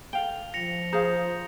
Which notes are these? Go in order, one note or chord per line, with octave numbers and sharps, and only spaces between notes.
A4 F5 G5 F7 G7
F3 A#6 C#7 F7
G#4 C5 F5 A#5 D#6 G6